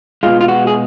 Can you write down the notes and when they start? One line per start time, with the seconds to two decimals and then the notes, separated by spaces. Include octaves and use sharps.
0.23 B2 G#3 F4
0.41 F4
0.48 F#4
0.67 G#4